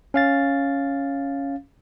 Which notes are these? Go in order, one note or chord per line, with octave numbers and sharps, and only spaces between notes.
C#4 F5 A6